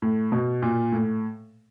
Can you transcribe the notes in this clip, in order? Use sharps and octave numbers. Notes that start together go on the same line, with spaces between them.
A2
B2
A#2
A2